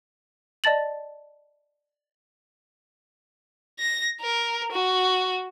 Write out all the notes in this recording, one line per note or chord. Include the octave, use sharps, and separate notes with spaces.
D5 D#5 A5 A6 F#7
A#6
A#4
F#4